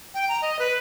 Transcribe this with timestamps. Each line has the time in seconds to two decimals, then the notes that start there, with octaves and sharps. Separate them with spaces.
0.14 G5
0.29 A#5
0.42 D#5
0.59 B4